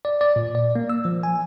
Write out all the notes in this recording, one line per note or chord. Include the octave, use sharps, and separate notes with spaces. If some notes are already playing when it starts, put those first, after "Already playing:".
D5
D5
A#2
D5
A#3
E6
F3
G#5